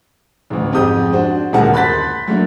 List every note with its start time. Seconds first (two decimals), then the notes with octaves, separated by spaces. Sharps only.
0.50 A1 D2
0.72 F2 G#2 G4 D#6 G6
1.13 D4 F#4 C5
1.53 D#1 D2 G#3 A#4 F#5 A5
1.74 B5 C6 F#6 G6 A6 B6
2.28 F#3 A3 A#3 D4